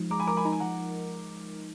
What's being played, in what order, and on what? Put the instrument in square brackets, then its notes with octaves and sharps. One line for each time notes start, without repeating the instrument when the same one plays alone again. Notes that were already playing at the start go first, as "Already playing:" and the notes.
Already playing: [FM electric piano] F3 G#3 D#4
[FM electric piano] G#3 [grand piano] A#5 D6
[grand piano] G#5 B5
[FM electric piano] A#4 [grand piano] A#5 D6
[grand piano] G#5 B5
[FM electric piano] D#4 [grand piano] A#5
[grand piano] G#5
[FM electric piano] F3 [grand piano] F#5 A#5